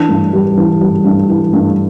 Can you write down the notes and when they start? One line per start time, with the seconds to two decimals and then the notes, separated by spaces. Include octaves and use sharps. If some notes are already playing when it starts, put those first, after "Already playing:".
Already playing: E3 D4
0.09 G2
0.33 G3
0.57 E3
0.81 G3
1.05 G2
1.29 E3
1.53 G2